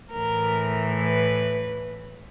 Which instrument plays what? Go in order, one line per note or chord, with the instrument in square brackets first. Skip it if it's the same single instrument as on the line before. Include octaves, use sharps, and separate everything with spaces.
[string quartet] A2 E3 A#4
B4